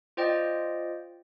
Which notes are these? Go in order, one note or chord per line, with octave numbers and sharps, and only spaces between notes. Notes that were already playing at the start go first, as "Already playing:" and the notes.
F4 C5 D5 D#5 G5